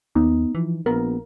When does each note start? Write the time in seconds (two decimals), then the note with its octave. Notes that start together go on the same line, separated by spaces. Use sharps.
0.16 D#2 B3 D#4
0.55 E3 F3
0.86 A#1 B3 A#4